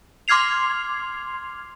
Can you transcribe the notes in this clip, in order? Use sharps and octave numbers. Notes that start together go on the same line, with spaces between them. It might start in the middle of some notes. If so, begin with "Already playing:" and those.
C6 D6 F6 G#6 C7 F7